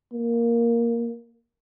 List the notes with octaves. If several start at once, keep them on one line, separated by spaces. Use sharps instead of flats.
A#3